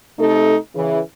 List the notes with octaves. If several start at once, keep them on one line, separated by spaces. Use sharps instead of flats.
C3 A3 D#4 A4
C#3 E3